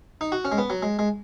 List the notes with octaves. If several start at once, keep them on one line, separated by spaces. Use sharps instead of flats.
D#4
F#4
C#4
G#3
B3
F#3
G#3
G#3